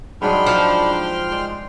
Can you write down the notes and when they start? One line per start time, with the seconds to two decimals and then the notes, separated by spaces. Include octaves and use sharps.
0.22 G#2 F#3 G#3 D4 G5 B5 C6 F6
0.46 F3
1.32 G#3 C5 D5